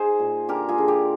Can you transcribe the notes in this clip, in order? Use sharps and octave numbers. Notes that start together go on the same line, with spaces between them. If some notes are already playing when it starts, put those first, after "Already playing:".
Already playing: D#4 G#4 C5
A#2
D3 G4 A#4
F4 G#4
D3
G4